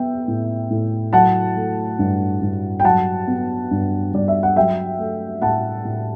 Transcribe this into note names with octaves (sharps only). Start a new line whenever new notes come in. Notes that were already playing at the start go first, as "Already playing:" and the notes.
Already playing: B3 E5 G5
A2
A2
F#3 F#5 A5
A3
G2
G2
G5
F#3 F#5 A5
B3
G2
G2 D5
E5
F#5
F#3 E5 G5
A3
A2 F#5 A5
A2